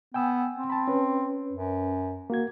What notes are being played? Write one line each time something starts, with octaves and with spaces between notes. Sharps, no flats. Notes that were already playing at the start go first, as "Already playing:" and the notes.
B3 G5 G#5 E6
C4
A5 B5
C#4 B4
F#2
A#3 F#4 G#6